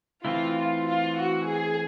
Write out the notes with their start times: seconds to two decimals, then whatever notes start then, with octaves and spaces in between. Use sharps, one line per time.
0.24 E3 A3 C4 E4 F4
0.56 F4
0.86 F4
1.17 F#4
1.49 G#4